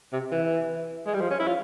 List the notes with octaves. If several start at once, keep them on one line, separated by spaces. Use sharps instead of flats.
C3
E3
G#3
G3
F3
C#4
E4
F4